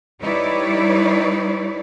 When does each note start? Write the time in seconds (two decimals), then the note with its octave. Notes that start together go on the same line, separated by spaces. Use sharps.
0.22 G3 D#4 E4 B4 C#5 D5